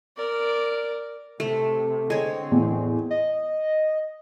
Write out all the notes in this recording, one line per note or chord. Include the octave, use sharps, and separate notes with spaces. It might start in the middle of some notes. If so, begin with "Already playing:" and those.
A#4 D5
C3 A3
D3 G#3 C4 C#5
E2 A2 B3
D#5